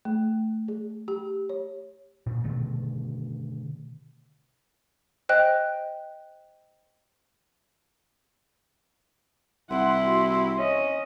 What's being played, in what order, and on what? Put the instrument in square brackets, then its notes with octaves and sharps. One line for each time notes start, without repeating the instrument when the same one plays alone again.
[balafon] A3
G#4
G4
C#5
[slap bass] A#2
B2 D3 D#3 A3
[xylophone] C5 D#5 G5 F#6
[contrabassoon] C2 [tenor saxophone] E4 [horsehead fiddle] F#5 [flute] C6
[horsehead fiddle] F#4
[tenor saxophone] C#4 [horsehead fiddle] D#5